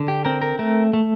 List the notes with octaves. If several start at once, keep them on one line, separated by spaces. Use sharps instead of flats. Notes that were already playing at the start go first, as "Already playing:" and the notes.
Already playing: D3
G4
C4 A#4
A#4
A3 A#4
A3